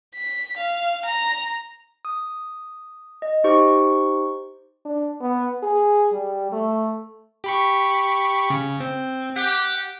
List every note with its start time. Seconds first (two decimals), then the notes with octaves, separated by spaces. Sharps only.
0.15 B6
0.57 F5
1.06 A#5
2.05 D#6
3.22 D#5
3.44 D#4 G4 C5 C#6
4.85 D4
5.21 B3
5.63 G#4
6.12 G3
6.52 A3
7.44 G4 B5 C#6
8.50 C#3
8.81 C4
9.36 G4 F#5